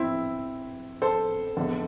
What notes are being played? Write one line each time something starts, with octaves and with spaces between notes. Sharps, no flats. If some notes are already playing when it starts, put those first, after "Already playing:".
Already playing: C4 E4
A4 C5
F1 E2 D3